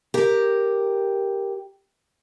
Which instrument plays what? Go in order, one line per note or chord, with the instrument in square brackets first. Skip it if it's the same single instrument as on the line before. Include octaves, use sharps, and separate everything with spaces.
[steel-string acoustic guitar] G4 A#4